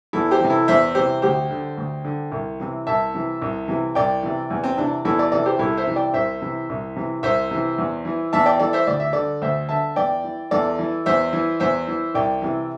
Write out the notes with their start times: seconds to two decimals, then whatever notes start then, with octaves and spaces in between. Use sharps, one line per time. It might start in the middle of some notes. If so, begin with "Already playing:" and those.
0.13 E2 E4 A4
0.31 G4 C5
0.40 C3 E3
0.50 E4 A4
0.68 E2 C5 E5
0.95 C3 E3 G4 C5
1.22 D2 G4 C5
1.51 D3
1.77 D2
2.05 D3
2.32 C2
2.60 C3 E3
2.87 C2 E5 A5
3.14 C3 E3
3.42 C2
3.68 C3 E3
3.95 C2 D5 G5
4.23 C3 E3
4.50 E2
4.64 C4
4.77 C3 E3 D4
5.05 E2 E4 A4
5.19 A4 D5
5.32 C3 E3 A4 D5
5.46 G4 C5
5.59 C2 E4 A4
5.77 C5 E5
5.87 C3 E3
5.96 D5 G5
6.14 C2 C5 E5
6.42 C3 E3
6.69 C2
6.96 C3 E3
7.23 C2 C5 E5
7.51 C3 E3
7.78 E2
8.05 E3
8.33 E2 E5 A5
8.46 D5 G5
8.59 E3 A4 D5
8.73 C5 E5
8.87 D2 D5
9.00 E5
9.12 D3 A4 D5
9.42 D2 C5 E5
9.69 D3 E5 A5
9.96 E2 D5 G5
10.24 E3
10.51 E2 A4 D5
10.79 E3
11.06 E2 C5 E5
11.33 E3
11.60 E2 C5 E5
11.88 E3
12.14 C2 D5 G5
12.42 C3 E3